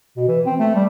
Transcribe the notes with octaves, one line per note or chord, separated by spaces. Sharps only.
B2
E3
C4
A3
G3